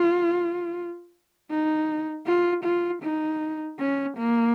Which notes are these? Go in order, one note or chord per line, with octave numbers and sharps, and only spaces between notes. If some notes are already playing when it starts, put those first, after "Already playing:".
Already playing: F4
D#4
F4
F4
D#4
C#4
A#3